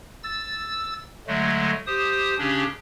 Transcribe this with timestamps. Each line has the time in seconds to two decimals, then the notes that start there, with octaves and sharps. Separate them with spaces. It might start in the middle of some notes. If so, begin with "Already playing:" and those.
0.24 E6 A6
1.27 D3 F#3 G#3 A3
1.87 G4 C5 D#6
2.38 C#3 C#4 D4 G4